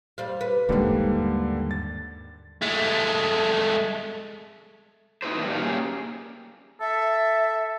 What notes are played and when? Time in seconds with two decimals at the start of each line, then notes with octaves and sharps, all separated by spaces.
0.18 G3 C5 F5
0.41 B4
0.69 D#2 G#2 D3 G3 A#3
1.71 A6
2.62 G#3 A3
5.22 B3 D#4 E4 F#4 B4 C5
5.37 D#3 G3 A#3 D4 F#4 B4
5.48 A#2 G3 A3 D#4 F5
5.62 A#3 C#4 G4 G#4
6.81 A4 E5